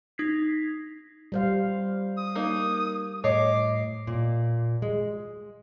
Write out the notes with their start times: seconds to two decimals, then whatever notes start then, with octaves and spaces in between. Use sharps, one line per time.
0.18 D#4 G#6 B6 C7
1.32 G3 C5 F5
2.17 D#6
2.35 A#3 D#4
3.24 A2 C#5 D#5 D6 C7
4.07 A#2
4.82 G#3